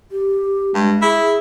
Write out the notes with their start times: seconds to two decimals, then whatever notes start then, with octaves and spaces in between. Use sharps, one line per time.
0.11 G4
0.75 G2 G#3
1.02 E4 G#4